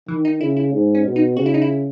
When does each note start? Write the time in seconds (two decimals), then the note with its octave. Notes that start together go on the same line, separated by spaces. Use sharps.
0.08 D#3 E3
0.25 D#4
0.41 C#3 E4
0.57 E4
0.73 G#2
0.95 C#4
1.05 B2
1.16 D#4
1.37 C#3 F#4
1.46 E4
1.54 D#4
1.62 E4